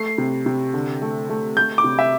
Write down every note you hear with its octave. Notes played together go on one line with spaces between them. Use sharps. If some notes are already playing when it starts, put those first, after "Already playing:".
Already playing: A3 C7
C3
C3
D3
A3
A3
A3 G6
D6
C3
E5